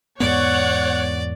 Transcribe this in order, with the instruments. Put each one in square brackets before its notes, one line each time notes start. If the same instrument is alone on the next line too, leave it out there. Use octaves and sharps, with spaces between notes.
[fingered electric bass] E2 G#2 B3 [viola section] C#5 F#5 [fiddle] D5